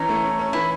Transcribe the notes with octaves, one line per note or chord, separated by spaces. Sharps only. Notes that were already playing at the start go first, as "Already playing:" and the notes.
Already playing: E3 C#4 D#4
A3
C#4
C#4
E3 E4